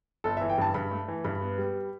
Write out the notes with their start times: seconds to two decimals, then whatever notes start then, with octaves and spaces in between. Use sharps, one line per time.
0.24 G1 A4
0.37 E3 E5
0.49 G5
0.58 G2 A5
0.74 G2 B5
0.91 A3
1.08 E3
1.24 G2 B5
1.41 B3
1.58 G3